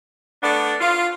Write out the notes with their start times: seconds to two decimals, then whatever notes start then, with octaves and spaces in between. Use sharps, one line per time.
0.43 A3 B3 D4 D5
0.80 F4